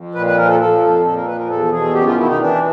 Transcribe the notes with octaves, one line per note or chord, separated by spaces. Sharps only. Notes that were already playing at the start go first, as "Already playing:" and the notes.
Already playing: F2
A#2 B4
B4
F3 A#4
A4
F3 A4
F2
A#2 A4
A#4
F3 B4
A#4
E2 A4
B2 G#4
F#2 G4
F4
D#3 E4
D#4
E3 D4